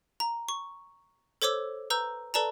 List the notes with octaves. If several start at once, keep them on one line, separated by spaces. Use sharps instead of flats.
A#5
C#6
A4 C5 C#5 D6 E6
B4 A#5 E6 G6
A4 B4 D5 A5 A#5